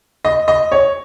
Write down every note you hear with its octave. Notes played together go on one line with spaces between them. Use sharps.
D#5
D#5
C#5